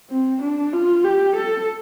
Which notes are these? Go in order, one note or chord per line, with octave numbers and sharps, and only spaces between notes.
C4
D4
F4
G4
A4